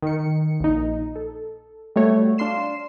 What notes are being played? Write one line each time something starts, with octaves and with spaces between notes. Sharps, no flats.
D#3 C#7
A#1 D#4
A4
G3 A3 F#4 C#5
D4 F5 C6 C7 E7